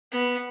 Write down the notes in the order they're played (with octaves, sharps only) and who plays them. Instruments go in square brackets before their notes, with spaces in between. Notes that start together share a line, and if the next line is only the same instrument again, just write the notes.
[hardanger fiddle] B3